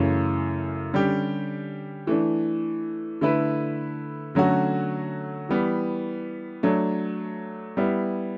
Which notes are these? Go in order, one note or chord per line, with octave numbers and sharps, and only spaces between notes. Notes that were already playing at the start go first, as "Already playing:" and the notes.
Already playing: F#2 C#3 E3 A3 C#4
D3 G3 C#4 G4
E3 A3 D4
D3 A3 E4 B4
D3 F#3 A3 C#4 F#4
E3 G3 B3
F#3 A3 D4
G3 B3 E4